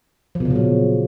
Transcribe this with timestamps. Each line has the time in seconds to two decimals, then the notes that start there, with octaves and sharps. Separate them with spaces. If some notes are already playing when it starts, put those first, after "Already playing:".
0.35 F3
0.40 B2
0.45 C#3
0.50 A#2
0.55 F#3